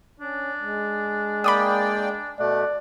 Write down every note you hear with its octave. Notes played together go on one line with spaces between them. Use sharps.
C#4 D4
G#3
A#3 D5 G5 B5 D6 D#6
B2 A3 D5 F#5